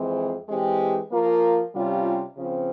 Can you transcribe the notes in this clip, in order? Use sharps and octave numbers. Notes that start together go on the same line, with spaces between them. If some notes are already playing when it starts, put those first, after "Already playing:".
Already playing: F2 E3 G#3 C4
E3 G#3 C4 G4
F3 A#3 F4 A#4
C3 G3 C#4 F4
C#3 F3 C4